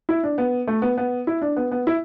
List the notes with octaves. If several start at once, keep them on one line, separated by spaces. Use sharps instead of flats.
E4
D4
B3
A3
B3
B3
E4
D4
B3
B3
E4